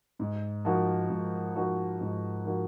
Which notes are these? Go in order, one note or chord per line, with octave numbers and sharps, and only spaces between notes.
G#2
F3 A#3 D#4 F#4
G#2
F3 A#3 D#4 F#4
G#2
F3 A#3 D#4 F#4